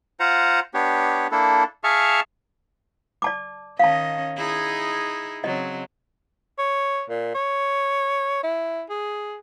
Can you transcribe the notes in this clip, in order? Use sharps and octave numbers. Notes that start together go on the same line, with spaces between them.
F4 C5 F#5 A#5
B3 D4 G4 C#5
A#3 D4 E4 A4
G#4 E5 F5 A5 C#6 F6
D5 A5 D6
D#3 C#4 D#5 F5 A5
D#4 E4 G#4
C#3 F#3 C4 D#5
C#5
A#2
C#5
E4
G#4